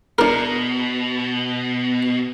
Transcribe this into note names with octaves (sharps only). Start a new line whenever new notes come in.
B2 D4 A#4